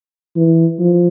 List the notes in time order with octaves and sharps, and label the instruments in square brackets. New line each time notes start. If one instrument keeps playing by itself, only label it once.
[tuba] E3
F3